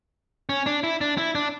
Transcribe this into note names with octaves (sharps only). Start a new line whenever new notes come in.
C#4
D4
E4
D4
E4
D4